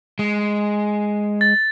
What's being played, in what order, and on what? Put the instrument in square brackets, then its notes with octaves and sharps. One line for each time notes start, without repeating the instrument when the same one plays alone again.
[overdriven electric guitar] G#3
[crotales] A6